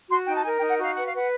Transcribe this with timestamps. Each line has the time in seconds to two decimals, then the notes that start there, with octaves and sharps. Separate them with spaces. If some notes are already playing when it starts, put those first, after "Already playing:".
0.10 F#4 C6
0.27 D#4 G5
0.36 A5
0.45 A#4 G#5
0.58 G5
0.61 D#4
0.70 F#5
0.79 F#4 F5
0.94 B4 F#5
1.06 F5
1.13 B4 F#5